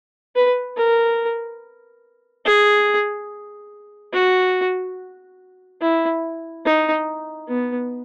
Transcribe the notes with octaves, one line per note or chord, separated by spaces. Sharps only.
B4
A#4
G#4
F#4
E4
D#4
B3